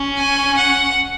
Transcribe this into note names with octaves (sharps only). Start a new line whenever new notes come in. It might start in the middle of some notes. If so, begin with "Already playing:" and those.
Already playing: C#4
G#5
F#5